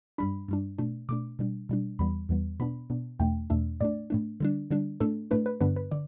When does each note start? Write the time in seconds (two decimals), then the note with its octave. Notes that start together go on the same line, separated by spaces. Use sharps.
0.18 G2 G3 D4 B5
0.48 G2 G3 D4
0.78 B2 A3 D4
1.09 B2 A3 D4 D6
1.39 B2 G3 D4
1.69 B2 G3 D4
1.99 E2 E3 G3 B3 B5
2.29 E2 E3 G3 B3
2.60 B2 B3 D4 B5
2.90 B2 B3 D4
3.19 E2 B2 A3 D4 G5
3.50 E2 B2 A3 D4 E5
3.80 A2 A3 D4 D5
4.10 A2 A3 D4
4.40 D3 G3 D4
4.71 D3 G3 D4
5.00 A2 A3 D4 A4
5.31 A2 A3 D4 B4
5.46 B4
5.61 G2 D3 B3 D4 B4
5.76 B4
5.91 D3 D5